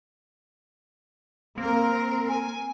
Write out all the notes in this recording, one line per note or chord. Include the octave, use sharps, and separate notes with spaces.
A#3 C4 A#4
G#5